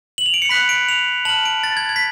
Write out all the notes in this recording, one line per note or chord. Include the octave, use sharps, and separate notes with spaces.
F#7
F7
D7
C#7
B5 F#6 B6
D7
F7
A5 F6 F#7
D7
A6
G#6
G#6
B6